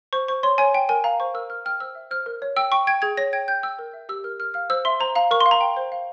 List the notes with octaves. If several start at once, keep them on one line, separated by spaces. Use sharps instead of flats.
C5 C#6
C5 C#6
C#5 C6
C#5 G#5
G5
A#4 G#5
F5 A#5
C5 C#6
A#4 E6
A#4 F6
G5 F6
C5 E6
E5
C5 F6
A#4
C#5
G5 E6
G5 C#6
G5 G#6
G#4 G#6
C#5 A#6
G5 G#6
G5 G6
G5 E6
A#4
E5
G4 E6
A#4 F6
A#4 F6
F5 F6
C5 E6
E5 C6
C5 A#5
F5 A#5
A#4 C#6
C6
F5
A#5
G5
C5
F5